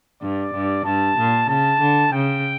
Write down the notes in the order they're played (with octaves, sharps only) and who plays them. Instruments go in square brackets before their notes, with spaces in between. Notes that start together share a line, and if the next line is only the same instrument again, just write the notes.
[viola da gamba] G2 [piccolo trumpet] D5
[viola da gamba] G2
[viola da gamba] G2 [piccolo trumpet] A5
[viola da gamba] A#2
[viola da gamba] C#3 [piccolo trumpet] A5
[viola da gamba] D3
[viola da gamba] C#3 [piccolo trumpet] G5